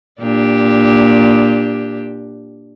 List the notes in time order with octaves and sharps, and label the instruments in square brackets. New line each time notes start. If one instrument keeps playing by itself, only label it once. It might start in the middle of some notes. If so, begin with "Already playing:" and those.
[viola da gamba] A#2 D4 G4